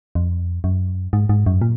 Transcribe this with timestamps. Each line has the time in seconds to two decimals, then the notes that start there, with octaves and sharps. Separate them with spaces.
0.15 F2
0.64 F#2
1.13 G#2
1.29 G#2
1.46 F#2
1.62 A#2